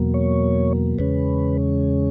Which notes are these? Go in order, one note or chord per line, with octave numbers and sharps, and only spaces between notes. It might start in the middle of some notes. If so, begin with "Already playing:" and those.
Already playing: E2 B2 F#3 A#3
C#5
E2 C#3 G#3 C#4 B4